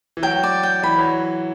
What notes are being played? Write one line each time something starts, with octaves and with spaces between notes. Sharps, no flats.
E3
F#3 G5
D5
G5
E3 B5
F#3